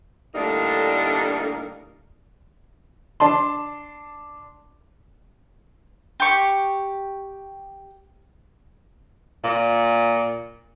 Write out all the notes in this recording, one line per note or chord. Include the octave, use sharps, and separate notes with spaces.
A2 D3 G3 A3 A#3 D#4
D4 A5 C6
G4 C#6
A#2